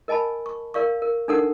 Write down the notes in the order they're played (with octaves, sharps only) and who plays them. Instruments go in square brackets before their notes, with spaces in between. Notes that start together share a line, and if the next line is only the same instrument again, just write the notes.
[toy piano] A#4 D#5 G#5 A5 B5
C#6
A#4 D5 F5 C#6
A#4
D4 D#4 A4 A#4 F#5